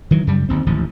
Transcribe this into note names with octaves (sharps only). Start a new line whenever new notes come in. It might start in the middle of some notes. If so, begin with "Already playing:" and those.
D#3 E3 F#3
F#2 C#3 G3
G1 D#2 C4
D1 A1 D#2 F3